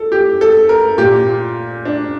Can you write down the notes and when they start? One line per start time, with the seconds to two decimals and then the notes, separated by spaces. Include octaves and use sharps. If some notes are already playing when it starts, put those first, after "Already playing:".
Already playing: A2 A4
0.12 G4
0.41 A4
0.69 A#4
0.98 A#2 G4
1.27 F4
1.85 D4